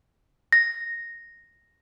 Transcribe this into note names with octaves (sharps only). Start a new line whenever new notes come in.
A#6